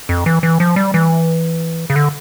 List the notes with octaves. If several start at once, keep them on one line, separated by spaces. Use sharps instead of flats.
F2
E3
E3
F3
G3
E3
C#3
D3